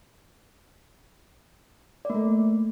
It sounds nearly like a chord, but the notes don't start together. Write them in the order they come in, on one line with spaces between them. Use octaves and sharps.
D5 A#3 A3